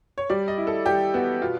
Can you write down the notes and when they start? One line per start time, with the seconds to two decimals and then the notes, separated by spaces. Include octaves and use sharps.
0.18 C#5
0.30 G3 D5
0.48 D#5
0.58 E4
0.67 A4
0.86 G3 G4
1.14 B3 F#4
1.41 B2 F4